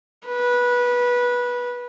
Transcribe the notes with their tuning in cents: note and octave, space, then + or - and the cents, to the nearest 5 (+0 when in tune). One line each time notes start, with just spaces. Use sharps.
B4 -20